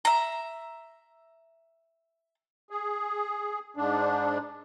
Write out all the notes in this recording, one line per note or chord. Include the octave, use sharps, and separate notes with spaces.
E5 A#5
G#4
G#2 D4